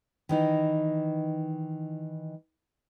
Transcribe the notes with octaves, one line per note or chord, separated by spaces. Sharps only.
D#3 E3 D#4